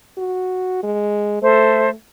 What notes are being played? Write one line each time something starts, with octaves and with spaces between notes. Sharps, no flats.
F#4
G#3
A3 A4 C5 E5